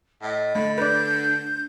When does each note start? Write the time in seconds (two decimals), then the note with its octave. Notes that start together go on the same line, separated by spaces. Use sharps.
0.22 A2 D#5
0.55 D3 A3 B5
0.78 D4 B4 D5 G6